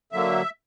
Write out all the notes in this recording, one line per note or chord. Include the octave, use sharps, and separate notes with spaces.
D3 F#3 A#3 E5